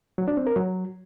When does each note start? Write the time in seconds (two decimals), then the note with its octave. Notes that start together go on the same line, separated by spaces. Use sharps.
0.18 F#3
0.28 D4
0.37 C4
0.47 A#4
0.56 F#3